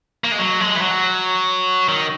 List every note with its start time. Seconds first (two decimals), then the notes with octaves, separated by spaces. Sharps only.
0.24 A#3
0.32 G#3
0.39 F#3
0.60 G#3
0.76 E3
0.81 F#3
1.88 D#3